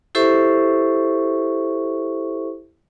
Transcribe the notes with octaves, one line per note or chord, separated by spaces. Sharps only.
E4 G4 A4 C5 E5 C#6